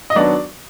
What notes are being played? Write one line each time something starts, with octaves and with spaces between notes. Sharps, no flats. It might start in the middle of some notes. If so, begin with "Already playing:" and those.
D#5
D#3 F#3 B3 D4 D5